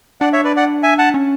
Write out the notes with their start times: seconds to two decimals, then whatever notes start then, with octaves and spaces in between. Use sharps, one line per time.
0.21 D4 D5 F#5
0.33 C#5 E5
0.44 B4 D5
0.56 D5 F#5
0.83 E5 G#5
0.98 F#5 A5
1.14 C#4